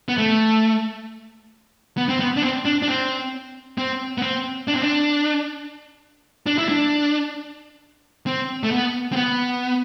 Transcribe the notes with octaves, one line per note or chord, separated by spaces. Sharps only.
B3
A3
B3
C4
B3
D4
C4
D4
D4
C4
C4
B3
C4
D4
C4
D4
D4
E4
D4
C4
A3
B3
C4
B3